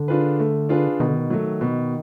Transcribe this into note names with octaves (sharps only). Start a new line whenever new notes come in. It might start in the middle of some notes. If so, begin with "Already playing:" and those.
Already playing: D3
D4 F4 G#4 B4
A3
D4 F4 G#4 B4
B2 D#3
D3
D#3
F#3 A3
B2